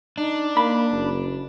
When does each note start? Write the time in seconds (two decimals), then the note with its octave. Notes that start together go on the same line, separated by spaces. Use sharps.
0.18 D4 D#4
0.57 A#3 B5
0.92 F#1